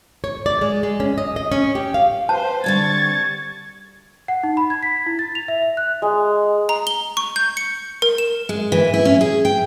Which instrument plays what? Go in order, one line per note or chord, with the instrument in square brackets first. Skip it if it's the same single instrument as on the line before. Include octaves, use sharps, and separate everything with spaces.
[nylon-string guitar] C#5
D5
G#3
G#3
C#4
D#5
D#5
C#4
G4
F5
[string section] B4 C5 [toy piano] A5
[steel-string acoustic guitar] D3 G3 C4 [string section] C#6 A6 [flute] G#6
[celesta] F#5
D#4
B5
G#6
B6
E4
A6
F7
E5
E5
F#6
[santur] G#3
[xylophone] A#5
G7
C#6
G6
C#7
A#4
E7
[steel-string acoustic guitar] G#3
E3
E4
C#4
G#4
G5